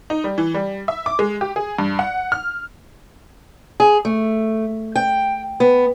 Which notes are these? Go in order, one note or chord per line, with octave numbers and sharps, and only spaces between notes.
D#4
G3
E3
G3
E5
D6
G#3
G4
G#4
G2
F#5
F6
G#4
A3
G5
B3